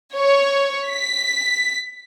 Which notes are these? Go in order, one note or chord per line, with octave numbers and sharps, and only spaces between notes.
C#5
B6